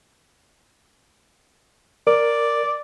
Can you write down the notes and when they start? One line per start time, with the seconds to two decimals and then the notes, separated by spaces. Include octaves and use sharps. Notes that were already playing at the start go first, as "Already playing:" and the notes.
2.07 A#4 D5